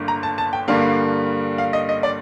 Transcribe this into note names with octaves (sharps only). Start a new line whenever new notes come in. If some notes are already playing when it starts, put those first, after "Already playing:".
Already playing: G1 G2 D3 A#3
A#5
A5
A5
G5
G2 D3 G3 A#3 F5
F5
D#5
D#5
D5